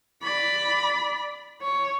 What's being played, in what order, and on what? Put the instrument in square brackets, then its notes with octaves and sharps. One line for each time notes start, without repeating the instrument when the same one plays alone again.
[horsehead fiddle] D5 B5
C#5